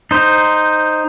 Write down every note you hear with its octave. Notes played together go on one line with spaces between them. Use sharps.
D#4 C5